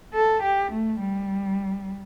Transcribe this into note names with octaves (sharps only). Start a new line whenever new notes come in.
A4
G4
A3
G3